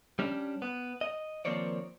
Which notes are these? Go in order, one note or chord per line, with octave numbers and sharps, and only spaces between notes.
G3 C#4 D4
B3
D#5
D#3 F3 A#3 C4 C#5 D5